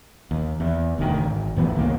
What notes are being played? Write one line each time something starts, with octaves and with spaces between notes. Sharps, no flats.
D#2
E2
E1 D2 D3 D#3
G#1
A1 F#2 E3 B3
C2 D#3 E3 A#3